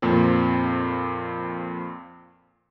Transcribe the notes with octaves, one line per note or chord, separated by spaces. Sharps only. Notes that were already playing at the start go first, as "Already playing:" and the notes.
F2 A#2 A#3 C4